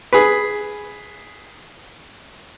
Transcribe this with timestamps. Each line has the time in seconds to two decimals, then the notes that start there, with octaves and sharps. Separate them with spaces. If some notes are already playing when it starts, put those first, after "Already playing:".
0.13 G#4 B4